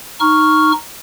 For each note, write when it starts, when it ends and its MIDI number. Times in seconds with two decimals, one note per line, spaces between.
0.20 0.72 63
0.20 0.72 85
0.20 0.72 89